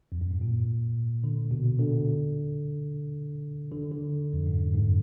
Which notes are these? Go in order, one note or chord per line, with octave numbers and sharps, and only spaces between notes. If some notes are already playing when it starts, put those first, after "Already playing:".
F2
F#2
G#2
A#2
D3
B2
D3
D3
D3
F2
G#2
F#2
G#2